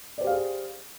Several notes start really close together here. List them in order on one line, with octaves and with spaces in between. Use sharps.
D5 C5 G4 F5 G#4